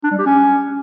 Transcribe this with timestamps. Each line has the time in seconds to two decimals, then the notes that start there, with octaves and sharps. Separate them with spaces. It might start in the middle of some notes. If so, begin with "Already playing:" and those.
0.04 D4
0.11 G3
0.19 G4
0.26 C#4